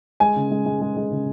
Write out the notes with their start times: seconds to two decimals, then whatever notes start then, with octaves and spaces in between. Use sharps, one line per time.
0.20 G#3 G#5
0.36 C#3
0.51 G#3
0.66 G#3
0.81 G#3
0.97 G#3
1.11 C#3